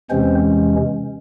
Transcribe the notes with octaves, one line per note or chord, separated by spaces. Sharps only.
E2 C3 E3 G#3 C4 C#4 C5